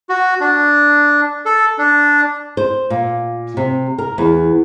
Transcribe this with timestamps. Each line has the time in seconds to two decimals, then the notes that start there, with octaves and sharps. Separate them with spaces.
0.09 F#4
0.41 D4
1.46 A4
1.78 D4
2.57 C5
2.90 A#2
3.57 C3
3.98 A#4
4.18 E2